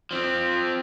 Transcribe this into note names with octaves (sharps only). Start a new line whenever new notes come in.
F3 C4